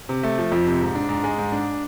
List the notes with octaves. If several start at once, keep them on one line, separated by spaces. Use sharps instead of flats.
C3
A3
F3
F2
C3
G#2
D4
G#2
G#3
G#2
D4